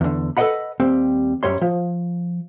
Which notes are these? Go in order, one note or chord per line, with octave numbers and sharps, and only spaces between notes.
E2 D3
A4 B4 D5 D#5 F#5 B5
D#2 G3 C4
F#2 G3 C#5 C6
F3